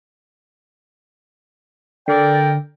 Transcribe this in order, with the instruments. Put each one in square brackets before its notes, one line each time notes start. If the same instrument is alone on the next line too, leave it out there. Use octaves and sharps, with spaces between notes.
[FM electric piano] D3 [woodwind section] A4 A#4 D5 [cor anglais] G5